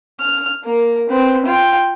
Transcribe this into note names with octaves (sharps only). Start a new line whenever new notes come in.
F6
A#3 A#4
C4 B4
F4 G5